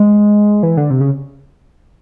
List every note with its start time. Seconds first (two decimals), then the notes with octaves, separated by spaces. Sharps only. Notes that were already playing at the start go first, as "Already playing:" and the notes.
Already playing: G#3
0.63 E3
0.77 D3
0.90 C3
1.01 C#3